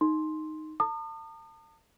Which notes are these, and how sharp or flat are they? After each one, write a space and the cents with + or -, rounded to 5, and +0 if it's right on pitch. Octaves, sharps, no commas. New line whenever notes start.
D#4 +0 C6 +5
A5 +40 D#6 -35